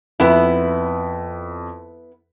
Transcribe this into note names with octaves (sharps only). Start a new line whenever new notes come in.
F2 B3 E4